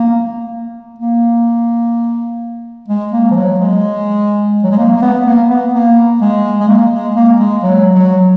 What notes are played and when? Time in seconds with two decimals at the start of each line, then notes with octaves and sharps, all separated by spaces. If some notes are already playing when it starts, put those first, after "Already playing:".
Already playing: A#3
0.98 A#3
2.88 G#3
3.12 A#3
3.31 F3
3.36 F#3
3.60 G#3
4.64 F#3
4.71 G#3
4.78 A#3
4.97 A#3
5.02 B3
5.26 A#3
5.50 B3
5.74 A#3
6.21 G#3
6.60 G#3
6.68 A#3
6.92 G#3
7.16 A#3
7.40 G#3
7.63 F#3
7.95 F#3